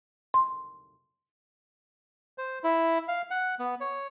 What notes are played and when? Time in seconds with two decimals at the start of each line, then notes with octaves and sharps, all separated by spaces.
0.34 C6
2.38 C5
2.64 E4
3.08 F5
3.30 F#5
3.59 B3
3.81 C#5